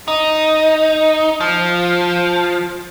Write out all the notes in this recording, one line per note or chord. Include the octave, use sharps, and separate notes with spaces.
D#4
F3